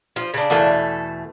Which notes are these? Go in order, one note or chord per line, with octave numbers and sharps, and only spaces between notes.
F3
C#3 D4
E2 B2 A3
A4